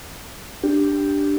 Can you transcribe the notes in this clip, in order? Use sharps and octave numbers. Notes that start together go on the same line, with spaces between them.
D4 G4